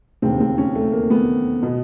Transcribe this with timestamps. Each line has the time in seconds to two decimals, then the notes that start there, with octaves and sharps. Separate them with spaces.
0.22 E1 D#2 C#3 C4
0.40 C4
0.58 C#4
0.75 A3
0.92 A#3
1.10 B3
1.63 B2